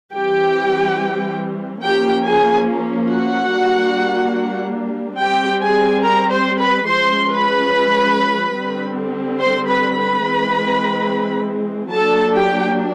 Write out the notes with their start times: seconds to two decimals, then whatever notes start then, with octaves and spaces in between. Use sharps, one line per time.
0.14 E3 G3 C4 G4 G5
1.82 F3 A#3 C#4 G4 G5
2.25 G#4 G#5
3.08 F#4 F#5
3.51 G3 A#3 D4
5.19 G3 C4 G4 G5
5.61 G#4 G#5
6.03 A#4 A#5
6.32 C5 C6
6.59 B4 B5
6.88 F3 G#3 C#4 C5 C6
7.29 B4 B5
8.56 D3 G3 C4
9.40 C5 C6
9.68 B4 B5
9.96 B4 B5
10.24 E3 G#3 C4
11.92 F#3 A#3 D4 A4 A5
12.34 G4 G5